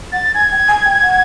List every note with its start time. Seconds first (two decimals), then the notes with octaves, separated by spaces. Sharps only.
0.12 F#5 A6
0.34 G#5 G#6
0.51 G5
0.68 G#5
0.85 G5
1.02 F#5